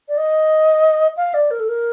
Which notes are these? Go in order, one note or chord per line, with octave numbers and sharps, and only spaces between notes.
D5
D#5
F5
D5
A#4
A4
A#4